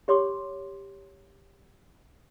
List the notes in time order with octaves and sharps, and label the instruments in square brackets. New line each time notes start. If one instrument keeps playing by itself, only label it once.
[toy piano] G4 C#5 C6 D6